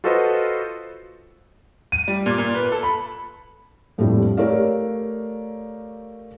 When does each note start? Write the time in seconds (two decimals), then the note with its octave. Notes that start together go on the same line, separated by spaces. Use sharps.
0.04 F4 F#4 A4 B4 C5 D#5
1.92 D#7
2.08 G3
2.26 A#2
2.38 A#2
2.54 B4
2.72 A4
2.83 B5
3.98 F2 A2 F3 G3 A#3 D4
4.37 A3 G4 A#4 C#5 D5 F5